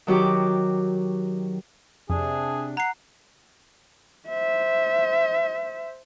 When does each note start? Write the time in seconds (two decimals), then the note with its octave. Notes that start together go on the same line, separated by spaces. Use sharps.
0.07 D#3 F#3 F#4 G4 D6
2.10 F2 C3 D4 G#4
2.77 F#5 A#5 C7
4.28 C5 E5